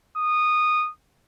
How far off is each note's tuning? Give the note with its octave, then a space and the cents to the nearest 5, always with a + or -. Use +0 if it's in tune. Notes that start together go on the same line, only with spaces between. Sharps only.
D#6 -15